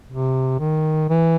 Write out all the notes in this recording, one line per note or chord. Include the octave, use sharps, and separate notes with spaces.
C3
D#3
E3